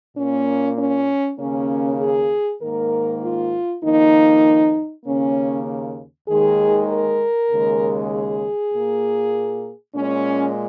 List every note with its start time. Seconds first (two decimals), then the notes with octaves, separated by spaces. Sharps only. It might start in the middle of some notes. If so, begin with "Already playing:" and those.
0.16 A#2 A#3 C#4
0.78 C#4
1.39 D#2 C#3 A#3 C#4
2.00 G#4
2.61 G#2 D#3 A#3 A#4
3.22 F4
3.84 F2 D#3 A#3 D#4
5.06 D#2 C#3 A#3 C#4
6.28 D#2 D#3 G#3 G#4
6.90 A#4
7.50 D#2 C#3 G#3
8.12 G#4
8.73 A#2 A#3
9.95 A#2 G#3 C#4